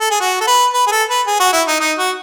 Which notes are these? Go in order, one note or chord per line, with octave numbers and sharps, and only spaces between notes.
A4
G#4
F#4
A4
B4
B4
G#4
A4
B4
G#4
F#4
E4
D#4
D#4
F#4